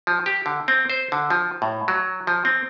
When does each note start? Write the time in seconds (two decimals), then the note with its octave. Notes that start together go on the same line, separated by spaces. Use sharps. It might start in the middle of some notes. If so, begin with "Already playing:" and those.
0.07 F3
0.26 G4
0.46 D3
0.68 C4
0.90 C5
1.12 D3
1.30 F3
1.62 A2
1.88 F#3
2.27 F3
2.45 C4